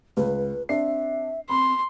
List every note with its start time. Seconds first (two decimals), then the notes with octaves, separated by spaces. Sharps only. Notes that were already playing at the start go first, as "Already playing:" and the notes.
0.17 C#2 B4
0.69 C4 D4 E5 C7
1.50 C4 B5 C6